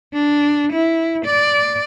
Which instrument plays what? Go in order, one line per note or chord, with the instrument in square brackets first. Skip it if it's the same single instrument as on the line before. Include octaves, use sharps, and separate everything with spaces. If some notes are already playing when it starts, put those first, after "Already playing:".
[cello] D4
E4
D5